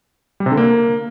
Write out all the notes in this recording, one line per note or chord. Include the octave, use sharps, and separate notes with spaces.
G3
C3
D3
A#3